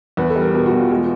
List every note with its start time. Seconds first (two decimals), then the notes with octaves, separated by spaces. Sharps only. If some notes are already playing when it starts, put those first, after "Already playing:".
0.17 E2 B4
0.30 A4
0.36 G3
0.41 A#4
0.54 B2 A#4
0.66 F#4
0.72 E2
0.78 F4
0.90 G#3 F4